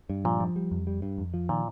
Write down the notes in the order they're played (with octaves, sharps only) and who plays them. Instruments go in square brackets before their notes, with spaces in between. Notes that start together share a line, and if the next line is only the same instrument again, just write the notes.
[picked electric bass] G2
[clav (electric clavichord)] A#2 [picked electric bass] F3
[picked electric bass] F3
G3
F2
G3
G2
F2
F3
[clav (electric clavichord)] A#2 [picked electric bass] D#3